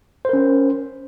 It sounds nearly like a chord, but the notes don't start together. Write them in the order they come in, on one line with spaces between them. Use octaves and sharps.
C5 A#4 C#4